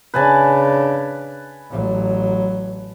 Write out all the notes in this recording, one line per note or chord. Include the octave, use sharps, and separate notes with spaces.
C#3 D4 B4 G#5 A5
A1 F#3